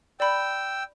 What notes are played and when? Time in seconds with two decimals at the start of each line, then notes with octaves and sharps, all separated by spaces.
0.20 D5 G5 B5 E6